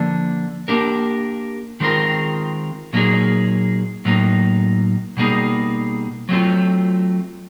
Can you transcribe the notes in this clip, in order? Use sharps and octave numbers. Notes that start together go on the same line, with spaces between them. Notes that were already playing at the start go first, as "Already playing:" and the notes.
Already playing: D3 F3 A#3 D4
A#3 D4 G4 A#4
D#3 G#3 C4 F4 A#4
A#2 F#3 A#3 D#4 G#4
A2 F#3 A#3 D#4
B2 G3 A#3 D#4 G#4
F#3 A3 C4 F4